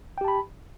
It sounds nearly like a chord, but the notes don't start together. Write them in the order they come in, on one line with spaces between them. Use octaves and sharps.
G5 G4 A5 B5